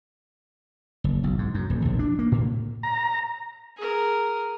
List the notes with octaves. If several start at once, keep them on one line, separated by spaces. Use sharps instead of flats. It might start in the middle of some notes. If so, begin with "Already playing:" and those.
F#1
B1
G#2
F#2
D#1
A#1
D4
A#3
A2
A#5
G#4 A#4